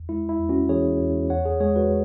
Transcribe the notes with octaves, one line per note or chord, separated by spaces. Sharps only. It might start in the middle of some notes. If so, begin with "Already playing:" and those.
Already playing: E2
G#3 E4
E4
E2
C#4 F#4
E3 G#4 C#5
E2
E2 C#5 F#5
G#4 C#5
G#3 G#4 C#5
F#4 B4